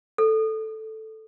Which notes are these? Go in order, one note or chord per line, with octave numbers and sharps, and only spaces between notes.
A4